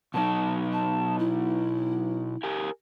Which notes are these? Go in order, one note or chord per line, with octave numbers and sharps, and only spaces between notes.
B2 F#3 D#4 A5
A5
E4
G4 A#4 G#5